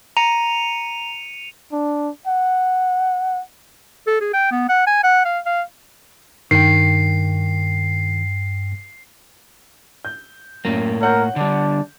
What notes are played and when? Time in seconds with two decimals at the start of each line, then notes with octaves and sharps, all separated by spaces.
0.17 A#5 C#7 D#7 F7
1.72 D4
2.27 F#5
4.07 A4
4.21 G#4
4.33 G5
4.51 B3
4.69 F#5
4.87 G#5
5.04 F#5
5.25 F5
5.46 F5
6.51 G2 D#3 G5 C7
10.05 G6
10.65 F#2 A2 A#3
11.01 A#4 C#5 F#5 G6
11.36 D3 G3 D4